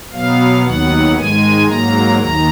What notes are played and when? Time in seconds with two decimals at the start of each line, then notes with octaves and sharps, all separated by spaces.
0.13 B2 F#3 B3 F5
0.64 D#2 D#3 F#3 B3 F#5
1.16 G#2 D#3 G#3 G#5
1.68 G#2 F#3 A#3 A#5
2.20 D#2 D#3 A#5